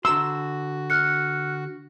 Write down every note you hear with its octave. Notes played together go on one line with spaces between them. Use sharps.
D3 F#4 A#5 C6 E6
F6 F#6 C#7